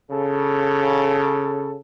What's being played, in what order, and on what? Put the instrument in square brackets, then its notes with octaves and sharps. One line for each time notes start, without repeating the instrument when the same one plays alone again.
[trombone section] C#3 A4